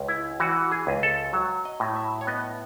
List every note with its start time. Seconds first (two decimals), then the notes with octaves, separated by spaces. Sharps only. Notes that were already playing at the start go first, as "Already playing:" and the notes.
Already playing: C#2
0.08 E4
0.40 E3 F#4
0.61 F#4
0.71 G#4
0.87 C#2
1.03 A4
1.33 F#3
1.65 D#5
1.80 A2
1.96 E5
2.21 C#5
2.27 B3 D#5